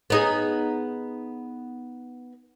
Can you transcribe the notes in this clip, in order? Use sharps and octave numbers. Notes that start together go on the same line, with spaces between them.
B3 D#4 G#4